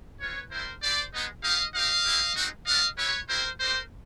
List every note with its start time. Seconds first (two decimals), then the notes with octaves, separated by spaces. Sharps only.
0.20 C4 F4 B4 C#5
0.51 G3 C4 E4 A#4 C5
0.82 C4 E4 G4 C5 D5
1.13 G#3 B3 D#4
1.43 B3 D#4 G4 D#5 F5
1.74 C4 D#4 G4 D#5 F5
2.06 C4 E4 G4
2.36 G#3 C4 D#4 F#4
2.66 B3 D4 F#4 D#5 F5
2.98 C4 E4 G4 B4 C#5
3.29 C4 E4 G4 A#4 C5
3.60 C4 D#4 G4 A#4 C5